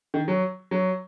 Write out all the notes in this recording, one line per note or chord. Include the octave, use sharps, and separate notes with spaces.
D#3
F#3
F#3